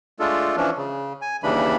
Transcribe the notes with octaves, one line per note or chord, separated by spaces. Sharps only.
G#3 A3 D4 F4 A4
E3 F3 C#4 D4
C#3
G#5
D#2 C#3 E3 G3 D4 B5